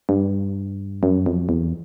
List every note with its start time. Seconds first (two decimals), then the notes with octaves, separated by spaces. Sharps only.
0.09 G2
1.03 F#2
1.26 F2
1.49 E2